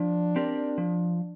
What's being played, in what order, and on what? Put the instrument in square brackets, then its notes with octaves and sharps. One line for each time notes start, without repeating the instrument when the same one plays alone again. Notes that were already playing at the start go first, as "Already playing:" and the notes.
Already playing: [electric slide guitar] F3 [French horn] D4
[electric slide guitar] C4 G4 A#4 D5
F3